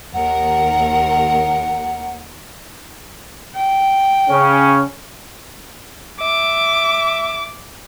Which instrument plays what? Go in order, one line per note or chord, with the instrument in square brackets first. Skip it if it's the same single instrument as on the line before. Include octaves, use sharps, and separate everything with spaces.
[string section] D#2 A#4 [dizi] F#5
[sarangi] G5
[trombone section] C#3 C#4
[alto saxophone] E5 [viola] D6